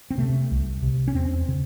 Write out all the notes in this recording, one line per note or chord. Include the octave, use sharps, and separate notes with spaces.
C4
C3 A3
C2
C3
C#4
E2 C4
C#3